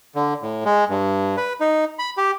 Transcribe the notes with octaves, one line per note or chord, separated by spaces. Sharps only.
D3
A2
G#3
G2
B4
D#4
B5
G4